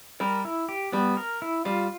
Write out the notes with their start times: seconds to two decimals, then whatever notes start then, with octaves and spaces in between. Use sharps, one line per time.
0.20 G3 A#4
0.45 E4
0.69 G4
0.92 G3 B3
1.17 A#4
1.42 E4
1.65 G3 F4